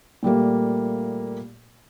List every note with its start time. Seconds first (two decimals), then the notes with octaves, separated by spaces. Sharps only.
0.23 A#2 G3 A3 A#3